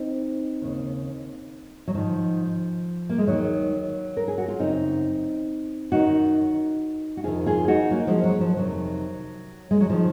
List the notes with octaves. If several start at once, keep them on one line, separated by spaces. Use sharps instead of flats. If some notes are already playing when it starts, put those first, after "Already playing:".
Already playing: C4 D#4
D#2 C#3
F#3
G#2 D#3 F3
A#3
G#3
D#2 D#3 F#3
A#4
G#4
F#4
F4
F#2 C#3 C4 D#4
F#2 D#3 D#4 F#4
F#4
F2 C3 D#3 F4 G#4
F4 G#4
D#4 F#4
F#3 A#3
F3 G#3
F#3
F3
F2 C3 D#3 F#3
G#3
F#3
D#3 F3